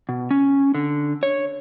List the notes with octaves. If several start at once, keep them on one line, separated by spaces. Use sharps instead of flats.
B2
C#4
D3
C#5